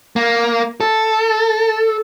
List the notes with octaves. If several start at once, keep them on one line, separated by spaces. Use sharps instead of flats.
A#3
A4